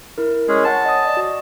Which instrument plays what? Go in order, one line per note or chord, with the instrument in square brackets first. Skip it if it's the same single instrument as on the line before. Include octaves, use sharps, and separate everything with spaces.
[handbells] E4 A#4
[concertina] G#3 C#4 G#4
[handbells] C#5 F#5 G#5 [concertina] A5
[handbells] D#5 D#6
D5 D#5
F#4